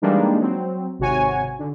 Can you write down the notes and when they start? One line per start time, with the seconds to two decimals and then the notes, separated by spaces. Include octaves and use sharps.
0.02 E3 G3 G#3 A#3 D4 D#4
0.40 F#3 C4
0.99 G#1 C3 F#4 C#5 G#5
1.59 D3